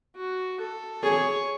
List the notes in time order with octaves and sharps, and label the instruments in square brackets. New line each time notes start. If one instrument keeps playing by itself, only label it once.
[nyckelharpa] F#4
A4
[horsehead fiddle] G#4 [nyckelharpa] C#5